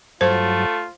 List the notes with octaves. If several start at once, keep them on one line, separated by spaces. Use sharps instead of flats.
G2 F#3 A3 F4 C5